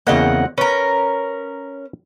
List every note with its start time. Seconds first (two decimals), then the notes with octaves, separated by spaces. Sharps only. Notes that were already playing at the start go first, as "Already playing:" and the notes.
0.07 E2 C#3 A#3 C4 D#5 F#5
0.58 C#4 A#4 B4